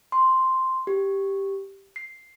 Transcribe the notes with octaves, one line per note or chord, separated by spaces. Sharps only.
C6
G4
C7